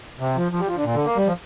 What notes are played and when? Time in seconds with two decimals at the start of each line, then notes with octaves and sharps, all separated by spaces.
0.20 C3
0.36 F3
0.52 F3
0.60 G3
0.67 F3
0.76 D3
0.84 A#2
0.95 D3
1.06 A#3
1.17 G3
1.27 F3